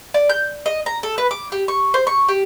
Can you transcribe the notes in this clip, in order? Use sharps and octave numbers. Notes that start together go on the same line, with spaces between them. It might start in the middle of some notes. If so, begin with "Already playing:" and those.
D5
G6
D#5
A#5
A4
B4
D6
G4
C#6
C5
C#6
G4